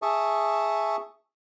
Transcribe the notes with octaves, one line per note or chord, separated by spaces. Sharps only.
G#4 E5 A5 C#6 D#6